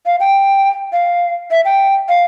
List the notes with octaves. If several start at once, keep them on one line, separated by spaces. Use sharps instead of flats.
F5
G5
F5
E5
G5
F5